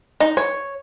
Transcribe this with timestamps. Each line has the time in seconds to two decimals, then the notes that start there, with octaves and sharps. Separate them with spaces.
0.20 D#4
0.37 C#5